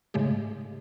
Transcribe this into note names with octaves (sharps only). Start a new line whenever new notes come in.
G#2 C#3 G#3 A3 G4